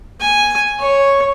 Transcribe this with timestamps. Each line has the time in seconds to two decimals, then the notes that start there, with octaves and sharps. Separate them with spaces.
0.21 G#5
0.79 C#5